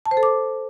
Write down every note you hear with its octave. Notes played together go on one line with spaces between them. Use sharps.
A5
C5
A4
D6